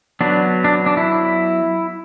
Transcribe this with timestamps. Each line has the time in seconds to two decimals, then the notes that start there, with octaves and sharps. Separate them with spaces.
0.21 F#3 B3 D4
0.64 D4
0.86 D4
0.97 E4